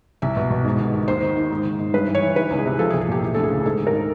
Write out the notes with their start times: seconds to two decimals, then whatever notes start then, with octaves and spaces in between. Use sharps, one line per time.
0.22 C2 E5
0.37 B2
0.51 B2
0.65 G#2
0.79 D#3
0.94 D#3
1.08 D#2 C5
1.22 D#3
1.37 D#3
1.50 G#2
1.65 D#3
1.79 D#3
1.94 G2 B4
2.08 E3
2.15 C#5
2.22 E3
2.36 D#3 B4
2.51 C#2
2.58 G#4
2.66 C3
2.79 F3 A4
2.90 G#4
2.94 C2
3.01 G#4
3.08 A#2 G4
3.22 E3
3.34 D2 A4
3.44 G#4
3.50 C#3
3.65 G#2 A4
3.79 D#3
3.87 A#4
3.93 D#3